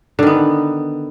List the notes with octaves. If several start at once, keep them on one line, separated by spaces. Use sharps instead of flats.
D3 D#3 B3